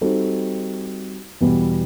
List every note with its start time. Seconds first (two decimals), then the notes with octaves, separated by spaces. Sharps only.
0.01 G3 C4 D#4 F#4 A4
1.41 E2 B2 G3 B3